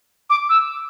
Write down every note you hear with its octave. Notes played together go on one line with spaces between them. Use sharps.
D6
E6